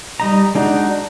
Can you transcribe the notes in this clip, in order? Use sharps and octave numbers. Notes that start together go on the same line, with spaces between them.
G3 D#4 A#5
G#3 D4 D#4 F#4